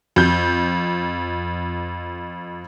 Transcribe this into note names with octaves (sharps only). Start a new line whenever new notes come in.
F2 G6